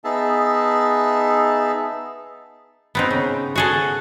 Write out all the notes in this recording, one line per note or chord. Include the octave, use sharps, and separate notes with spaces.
B3 D#4 G#4 E5 A5
B3 C4 D#4
C#3
F#4 G#4 A4